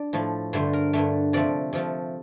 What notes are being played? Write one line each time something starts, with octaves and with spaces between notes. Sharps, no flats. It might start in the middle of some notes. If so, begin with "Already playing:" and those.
Already playing: D4 D5
A2 F3 A3
G2 D3 A3 C5
A#4
G2 D3 A3
C3 F3 A3 D5
C3 F3 A3